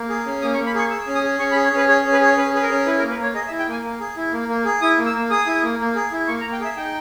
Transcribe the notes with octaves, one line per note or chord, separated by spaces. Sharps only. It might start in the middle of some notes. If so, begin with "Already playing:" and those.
Already playing: A#3
G#4
C#4
A#3 D#6
C#6
A#3
B5
G#4 C#6
G#4 E6
C#4
D#6
G#4
C#4 C#6
B5
G#4
C#5
C#4 B4
G#4 C#5
C#4
B4
G#4 C#5
C#4 B4
G#4 B4
A#4
C#4
E4 B4
A#4
A#3
B4
A#3 C#5
G#4 D#5
E5
E4
G5
A#3 G#5
A#3
G#4
E4
A#3
A#3
G#4
E4 D#6
A#3
E6
A#3
G#4 D#6
E4
A#3
A#3
G#4
E4
A#3 C#6
A#5
A#3
G5
G#4 E5
D#4 G5